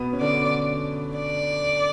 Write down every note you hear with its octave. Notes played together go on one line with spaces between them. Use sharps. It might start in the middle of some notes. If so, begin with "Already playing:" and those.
Already playing: B2 B3
C#4
D3 D4 D5
D5